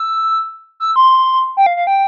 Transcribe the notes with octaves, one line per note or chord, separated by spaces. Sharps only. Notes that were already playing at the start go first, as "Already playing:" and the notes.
Already playing: E6
E6
C6
G5
F5
F5
G5